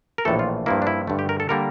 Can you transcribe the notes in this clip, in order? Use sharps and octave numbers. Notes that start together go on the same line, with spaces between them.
A#4
A#1 A2 E3 A3 A4
F4
G2 F3 A#3 E4
D4
E4
G2 D3 A3
G4
A#4
A4
D3 G3 A#3 A#4